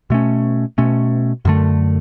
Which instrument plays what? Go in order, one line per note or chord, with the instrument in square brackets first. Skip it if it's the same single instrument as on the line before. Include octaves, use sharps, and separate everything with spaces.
[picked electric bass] B2 A3 C#4
B2 A3 C#4
F#2 D3 A3